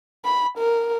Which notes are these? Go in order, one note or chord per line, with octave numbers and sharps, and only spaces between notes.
B5
A#4